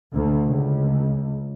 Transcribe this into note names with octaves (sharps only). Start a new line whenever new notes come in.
D2
C#2